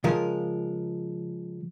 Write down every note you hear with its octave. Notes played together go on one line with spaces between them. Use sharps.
C#3 F3 G#3 A#4